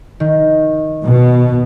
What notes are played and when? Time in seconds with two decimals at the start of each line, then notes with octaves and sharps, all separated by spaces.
0.20 D#3
1.05 B2